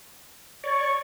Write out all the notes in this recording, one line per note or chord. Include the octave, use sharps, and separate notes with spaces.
C#5 D5 C#6